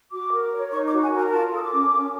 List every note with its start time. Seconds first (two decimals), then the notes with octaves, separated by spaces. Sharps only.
0.12 F#4 D6
0.32 A#4
0.52 C#5
0.72 D#4 C#6
0.87 D6
0.92 F#4
1.03 G#5
1.12 A#4
1.17 G#5
1.28 A#5
1.32 F4 A5
1.53 A4 D#6
1.62 D6
1.72 C#4
1.93 C#4